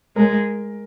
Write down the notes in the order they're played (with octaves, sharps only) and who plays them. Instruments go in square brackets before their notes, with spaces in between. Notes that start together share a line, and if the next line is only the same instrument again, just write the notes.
[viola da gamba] G#3 [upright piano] A#4